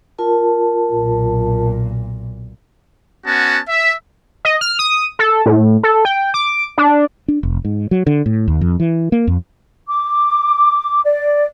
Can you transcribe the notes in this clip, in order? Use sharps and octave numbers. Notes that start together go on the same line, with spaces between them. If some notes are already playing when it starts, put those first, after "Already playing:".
F4 A#4 A5
B1 A#2
B3 C#4 F#4 A5
E5
D#5
F6
D#6
A4
A2
A4
G5
D6
D4
D4
F1
G#2
F#3
D3
A2
D#2
F2
E3
A#3
F2
D6
D5